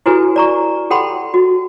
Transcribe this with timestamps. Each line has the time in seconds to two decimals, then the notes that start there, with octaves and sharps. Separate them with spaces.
0.06 E4 F#4 G4 A4 B4 G#5
0.36 D5 A#5 C#6
0.91 G4 A4 F#5 G5 B5 C6
1.34 F#4